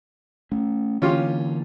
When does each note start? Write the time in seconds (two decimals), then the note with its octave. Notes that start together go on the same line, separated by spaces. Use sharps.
0.52 A3 C#4
1.02 D3 E3 A#3 C#4 F4 G4